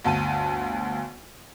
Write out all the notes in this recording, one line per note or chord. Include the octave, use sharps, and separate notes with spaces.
G1 D2 A5 D#7